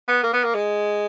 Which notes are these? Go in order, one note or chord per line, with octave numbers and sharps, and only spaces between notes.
B3
A#3
B3
A#3
G#3